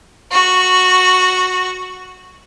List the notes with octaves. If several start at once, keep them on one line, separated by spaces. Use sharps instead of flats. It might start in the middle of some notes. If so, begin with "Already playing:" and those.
F#4 C#6